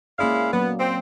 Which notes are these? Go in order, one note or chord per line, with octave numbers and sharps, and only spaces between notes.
G#3 A#3 C#4 E4 D5 F5
F#3 A#3 B3
C4